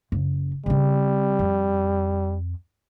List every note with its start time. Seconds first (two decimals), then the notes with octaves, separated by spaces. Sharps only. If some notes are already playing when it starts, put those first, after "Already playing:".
0.12 F#1
0.66 C#3 G3 C4
1.39 F2